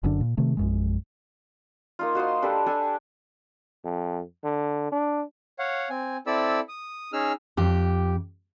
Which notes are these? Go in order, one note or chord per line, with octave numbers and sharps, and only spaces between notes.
F#1 F#2 D3 D4
A#2
C3 D#3 A3
A#1 F#2 G#3
A#3 D#4 F4
F#4 C5 D#5 C6
D4 G4 A4 B4
D4 G4 A4 G#5
F2
D3
D4
C#5 F5 F#5
C4 G#5
C4 E4 A4 D5 B5 E6
D#6
C#4 D#4 G#4 E6 F6
F2 G4